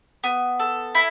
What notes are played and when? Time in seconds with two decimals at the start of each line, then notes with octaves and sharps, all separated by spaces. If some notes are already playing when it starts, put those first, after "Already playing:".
0.24 B3
0.59 A4
0.95 E4